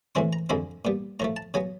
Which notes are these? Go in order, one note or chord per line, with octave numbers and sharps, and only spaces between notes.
A2 E3 G#3 C4 C6
A#5
F2 D3 F3 G#3 C4 B5
A#2 G3 B3
A2 F3 A3 A#5
A5
C#3 F#3 B3 G#5